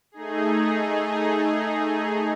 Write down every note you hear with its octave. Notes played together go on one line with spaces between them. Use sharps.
A3 D#4 G#4